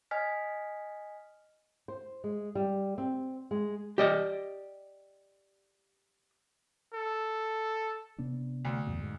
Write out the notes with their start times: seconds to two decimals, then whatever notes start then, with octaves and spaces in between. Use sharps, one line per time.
0.11 D#5 G#5 F6 B6
1.88 C5
2.24 G#3
2.55 G3
2.98 C4
3.51 G#3
3.98 G4 D5 D#5
6.94 A4
8.18 C3 B3 D4
8.65 D2
8.87 E2 G2 B2
8.99 G#2